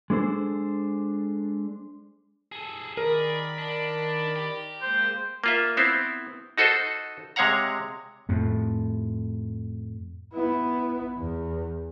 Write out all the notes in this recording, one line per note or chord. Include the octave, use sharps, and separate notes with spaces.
G#3 D4 A4 C5
G#4 A4
D#3 G#4 A#4 D5 B5
D4
G4
G#3 A#3 C5
A#3 F4 E5
B3 C4 E4 C5
D#4 F#4 A4 C5 D#5
C3 G#3 C#5 F5 F#5 A#5
F2 A2
B3 E4
E2